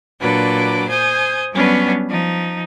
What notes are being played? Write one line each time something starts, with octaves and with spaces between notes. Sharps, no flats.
A#2 F#3 D4 B4 D6
C5 G#5 D#6 G6
F#3 G3 B3 C#4 D4 B4
F3 D#4